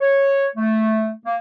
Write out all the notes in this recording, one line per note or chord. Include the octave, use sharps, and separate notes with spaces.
C#5
A3
A#3